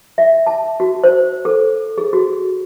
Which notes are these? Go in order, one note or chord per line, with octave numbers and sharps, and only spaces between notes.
E5
A5
F#4
C5
A4
G#4
F#4